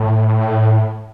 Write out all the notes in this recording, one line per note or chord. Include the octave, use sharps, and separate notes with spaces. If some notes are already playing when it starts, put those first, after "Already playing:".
Already playing: A2